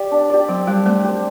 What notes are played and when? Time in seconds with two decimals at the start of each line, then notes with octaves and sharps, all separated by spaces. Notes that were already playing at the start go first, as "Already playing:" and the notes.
Already playing: G4 D5
0.11 D4
0.30 G4 D5
0.48 F#3 C4
0.67 G3 G4 C5
0.85 A3 C4
1.04 G4 C5